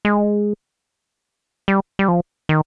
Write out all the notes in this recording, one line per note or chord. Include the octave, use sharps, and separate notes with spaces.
G#3
G3
G3
F3
D#3